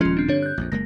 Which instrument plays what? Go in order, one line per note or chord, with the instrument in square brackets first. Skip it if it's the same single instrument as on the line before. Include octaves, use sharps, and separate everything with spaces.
[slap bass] D#1 G#3 [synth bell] F3 C#4 F4
[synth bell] C4 D4
[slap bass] G2 D3 [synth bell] D4 C#5
[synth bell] F#6 G6
[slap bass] A#1 F2
[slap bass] F#1 G#3 A#3 [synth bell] A#6